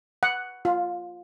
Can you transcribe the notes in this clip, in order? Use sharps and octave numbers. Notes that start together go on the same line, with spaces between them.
F#5
F4